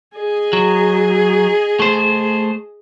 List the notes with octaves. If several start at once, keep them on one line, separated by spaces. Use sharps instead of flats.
G#4 D#5
F#3
A3 C5